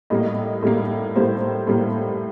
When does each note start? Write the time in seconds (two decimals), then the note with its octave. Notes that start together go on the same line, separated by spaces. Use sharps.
0.10 A2 G3 A#3 D#5
0.63 A2 G3 A#3
1.16 A2 G3 A#3 C5
1.67 A2 G3 A#3